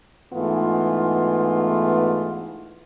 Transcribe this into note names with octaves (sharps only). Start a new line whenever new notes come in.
G#2 E3 A3 B3 F4